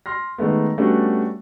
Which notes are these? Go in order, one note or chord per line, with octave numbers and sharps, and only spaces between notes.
C6 F6 A#6
D#3 G#3 A3 B3
G3 A3 B3 C#4 D4 F#4